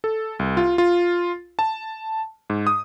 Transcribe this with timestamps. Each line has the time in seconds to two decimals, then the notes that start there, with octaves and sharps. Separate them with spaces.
0.04 A4
0.39 C2
0.57 F4
0.78 F4
1.59 A5
2.50 G#2
2.67 D#6